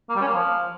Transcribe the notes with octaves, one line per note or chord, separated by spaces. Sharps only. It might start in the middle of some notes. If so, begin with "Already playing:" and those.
A#3
G3
C#4
A#3
F3